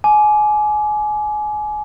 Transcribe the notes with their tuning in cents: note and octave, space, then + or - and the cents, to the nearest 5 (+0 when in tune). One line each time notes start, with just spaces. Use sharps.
G#5 +25 D6 +0